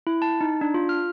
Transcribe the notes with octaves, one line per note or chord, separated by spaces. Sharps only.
E4
A5
D#4
D4
F4
F6